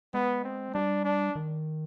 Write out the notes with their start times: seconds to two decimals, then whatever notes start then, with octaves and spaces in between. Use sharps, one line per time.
0.14 G#3 B3
0.44 C4
0.74 G3 D4
1.05 D4
1.36 D#3